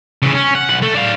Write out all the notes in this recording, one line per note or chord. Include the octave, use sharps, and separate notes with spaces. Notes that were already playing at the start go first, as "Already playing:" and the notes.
C#3 E3
C#4
F#5
B1 F#5
A3 A4
D4 F5